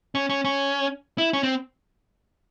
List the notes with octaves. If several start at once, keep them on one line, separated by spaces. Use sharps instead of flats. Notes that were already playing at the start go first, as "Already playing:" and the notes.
C#4
C#4
C#4
E4
C#4
C4